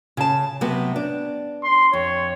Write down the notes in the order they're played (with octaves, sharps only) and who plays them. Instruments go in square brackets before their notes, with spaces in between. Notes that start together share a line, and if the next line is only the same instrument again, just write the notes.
[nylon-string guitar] C#3 A5
C3 F#3 B3
D4
[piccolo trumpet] C6
[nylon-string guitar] F2 [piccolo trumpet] C#5